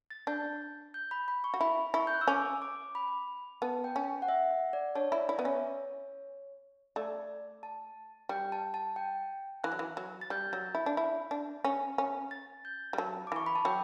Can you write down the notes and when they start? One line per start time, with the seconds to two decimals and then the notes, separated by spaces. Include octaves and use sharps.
0.10 A6
0.27 D4 G6
0.94 G6
1.11 B5
1.28 B5
1.44 C#6
1.54 F#4
1.61 E4 B5
1.94 E4 C#6
2.07 G6
2.14 F#6
2.21 E6
2.28 C#4 D6
2.62 D6
2.95 B5
3.62 B3 A5
3.84 G5
3.96 C#4
4.22 F#5
4.28 E5
4.51 F#5
4.73 D5
4.95 D4 C#5
5.12 E4 D5
5.29 E4 E5
5.39 B3
5.45 C#4 C#5
6.96 A3 D5
7.63 A5
8.29 G3 G5
8.52 A5
8.74 A5
8.96 G5
9.64 E3 F#6
9.72 F#3
9.79 E3
9.97 F#3
10.21 A6
10.30 G3 G6
10.53 F#3
10.75 E4
10.86 D4
10.97 E4
11.31 D4
11.64 C#4
11.98 C#4
12.31 A6
12.65 G6
12.93 G3
12.98 F#3 A5
13.27 D6
13.32 E3 C#6
13.46 B5
13.55 A5
13.65 F#3 G5